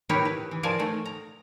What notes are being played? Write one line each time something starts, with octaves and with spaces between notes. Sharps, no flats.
D#4 E4 G4 A#4 B4 C#5
B4
E3
F3 A#4 D5 F5 G#5 A5
A3 D#4
A#5